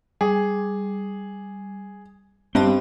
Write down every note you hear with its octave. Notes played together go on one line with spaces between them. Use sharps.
G3 G#4
G2 B3 C4 D#5 A5